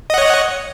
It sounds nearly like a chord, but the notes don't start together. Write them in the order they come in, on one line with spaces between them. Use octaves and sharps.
D#5 F#5 C#5